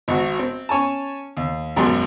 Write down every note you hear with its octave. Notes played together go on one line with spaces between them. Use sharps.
G#1 F#4
C4
C#4 C#5 G#5 A5
D#2
G#1 F#2 B2 G#3 G4 C6